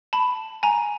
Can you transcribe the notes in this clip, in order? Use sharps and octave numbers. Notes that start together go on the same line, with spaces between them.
A5 B5
G#5 A#5